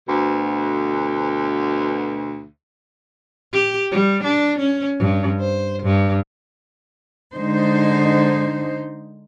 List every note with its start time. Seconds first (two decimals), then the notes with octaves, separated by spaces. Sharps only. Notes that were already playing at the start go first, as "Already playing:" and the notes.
0.08 D2 B2
3.53 G4
3.92 G3
4.24 D4
4.59 C#4
4.99 G2
5.40 C5
5.83 G2
7.33 D3 G#3 D#4 C5